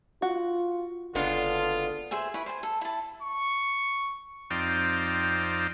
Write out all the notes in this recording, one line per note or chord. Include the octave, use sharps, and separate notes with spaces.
F4 F#4
F#1 D3 G#3 B3 D4 F4
G#4 C5 E5 G#5
E4 B4 C#5
C5 G#5
A4
E4 A5
C#6
F2 C4 D#4 D5 F5 G5